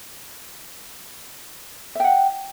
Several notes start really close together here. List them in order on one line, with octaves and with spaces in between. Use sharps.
E5 G5 F#5